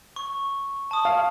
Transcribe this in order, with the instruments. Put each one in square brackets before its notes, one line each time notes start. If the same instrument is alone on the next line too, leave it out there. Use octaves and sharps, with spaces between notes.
[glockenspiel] C#6
A5 D#6
[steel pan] F5